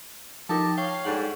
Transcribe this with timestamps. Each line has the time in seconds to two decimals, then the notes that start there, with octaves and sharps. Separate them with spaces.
0.49 F3 D#4 G4 A#4 A5
0.77 C#5 F5 G5
1.04 G#2 G3 D4 A4 F#5